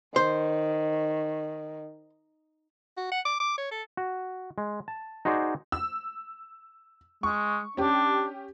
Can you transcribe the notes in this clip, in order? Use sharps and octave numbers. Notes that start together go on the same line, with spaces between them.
D#3 C5
F#4
F#5
D6
D6
C#5
A4
F#4
G#3
A5
D#4 F#4 G#4 C5 D5
E6
G#3 C#6
C#4 D4 G4